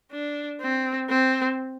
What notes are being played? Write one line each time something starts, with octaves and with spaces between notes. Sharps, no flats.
D4
C4
C4